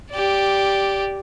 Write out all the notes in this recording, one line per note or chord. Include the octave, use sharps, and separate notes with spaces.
G4 D5